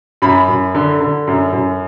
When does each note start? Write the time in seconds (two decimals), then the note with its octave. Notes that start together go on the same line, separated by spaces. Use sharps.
0.22 F#2 B5
0.48 F#2
0.75 D3
1.00 D3
1.27 F#2
1.53 F#2